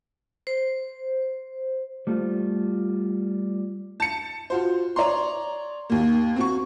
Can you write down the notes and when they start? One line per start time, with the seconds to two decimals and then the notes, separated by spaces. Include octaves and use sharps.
0.47 C5
2.07 G3 A3 F4
4.00 A5 C#7
4.50 F4 F#4 C5
4.96 C#5 D5 A#5 C6
5.90 D#2 A#3
6.36 C4 F#4 C#6